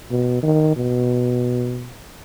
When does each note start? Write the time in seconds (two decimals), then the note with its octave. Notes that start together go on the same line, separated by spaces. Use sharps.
0.11 B2
0.43 D#3
0.76 B2